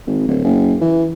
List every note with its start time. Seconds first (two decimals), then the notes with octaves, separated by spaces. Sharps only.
0.07 G#1
0.28 D1
0.44 F#1
0.81 E3